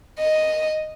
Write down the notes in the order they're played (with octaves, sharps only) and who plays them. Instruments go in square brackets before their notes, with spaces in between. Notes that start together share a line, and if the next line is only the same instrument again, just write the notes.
[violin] D#5